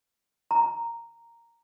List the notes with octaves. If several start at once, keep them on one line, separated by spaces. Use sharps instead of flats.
A#5